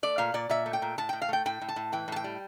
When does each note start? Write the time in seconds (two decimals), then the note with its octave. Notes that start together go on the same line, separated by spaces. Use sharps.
0.03 A3 D5
0.18 A#2 F5
0.34 A#2 D5
0.49 A#2 E5
0.66 A3
0.73 G5
0.82 A#2
0.98 A2 A5
1.09 A2 G5
1.22 F5
1.29 A3 G5
1.46 A2 G5
1.61 A2
1.69 A5
1.76 A2
1.92 E3 G5
2.08 A2 A5
2.16 G5
2.24 G3